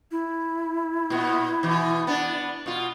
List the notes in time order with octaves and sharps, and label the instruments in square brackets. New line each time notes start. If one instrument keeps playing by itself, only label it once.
[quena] E4
[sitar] A#2 B3
B2 E3
B3 D4
B2 F4